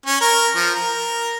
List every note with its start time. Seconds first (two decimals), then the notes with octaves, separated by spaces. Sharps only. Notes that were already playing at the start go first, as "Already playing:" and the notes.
0.06 C#4
0.21 A#4
0.56 F3
0.75 A#4